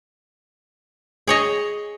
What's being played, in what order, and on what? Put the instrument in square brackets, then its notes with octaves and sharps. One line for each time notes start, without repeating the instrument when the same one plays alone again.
[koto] G#4 C#5 D#5